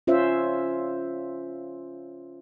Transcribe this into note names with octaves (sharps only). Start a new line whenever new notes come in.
C#4 F4 C5 E5